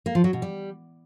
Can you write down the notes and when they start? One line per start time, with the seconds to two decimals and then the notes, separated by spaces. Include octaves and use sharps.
0.06 A#3
0.15 F3
0.24 F#3
0.33 B2
0.42 G3